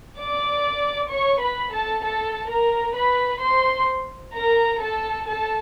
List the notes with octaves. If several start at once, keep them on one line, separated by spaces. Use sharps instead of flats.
D5 D6
C#5 C#6
B4 B5
A4 A5
A4 A5
A#4 A#5
B4 B5
C5 C6
A#4 A#5
A4 A5
A4 A5